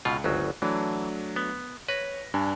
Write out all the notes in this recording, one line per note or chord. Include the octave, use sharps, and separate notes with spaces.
C#2 B2 F4
G1 D2 F#3
E3 F#3 A3 D4
B3
B4 C#5 A#6
G2 D4 G#5